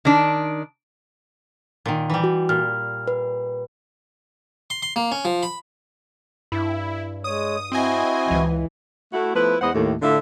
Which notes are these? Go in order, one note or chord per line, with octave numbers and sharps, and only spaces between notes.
D#3 D4
A#2 D#3
E3 G3
F#4
A#2 F6
B4
C6
C6
A#3
C#4
F3
B5
G2 E4
G#3 C#5 D#6
C4 E4 F#4 D#5 G#5
C#2 E3
A3 E4 F#4
F3 A3 B3 E4 B4
E2 G#3 B4 C5 D#5 F#5
D#2 A2
A2 D3 D4 F4 E5